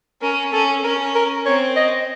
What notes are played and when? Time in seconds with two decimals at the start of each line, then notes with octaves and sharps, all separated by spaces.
0.22 C#4 A#4
0.52 C#4 A4
0.84 C#4 A#4
1.15 A#4
1.45 C4 C#5
1.76 D#5